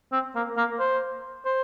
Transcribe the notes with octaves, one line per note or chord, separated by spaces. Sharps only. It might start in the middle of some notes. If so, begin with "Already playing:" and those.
C4
A#3
A#3
C5
C5